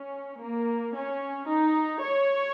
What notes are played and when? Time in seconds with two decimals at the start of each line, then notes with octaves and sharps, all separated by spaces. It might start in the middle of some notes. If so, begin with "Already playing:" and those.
Already playing: C#4
0.41 A#3
0.95 C#4
1.48 D#4
2.01 C#5